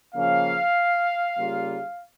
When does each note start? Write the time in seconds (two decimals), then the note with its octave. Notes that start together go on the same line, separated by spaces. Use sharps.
0.14 C#3 F3 A#3 C#4 F5
1.37 C#3 G3 A#3 F4